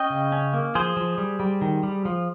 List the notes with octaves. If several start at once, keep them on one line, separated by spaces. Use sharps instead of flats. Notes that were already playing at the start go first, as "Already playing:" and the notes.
Already playing: C#4 D#5 G5
C#3
C#4
A#3
F3 G#4 C5
F3
G3
G3
D#3
G3
F3